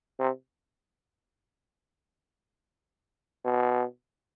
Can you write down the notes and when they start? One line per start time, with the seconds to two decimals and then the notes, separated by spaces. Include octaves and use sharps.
0.20 C3
3.44 B2